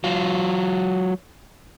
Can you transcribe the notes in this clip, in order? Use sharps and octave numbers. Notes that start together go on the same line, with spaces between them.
F#3 F4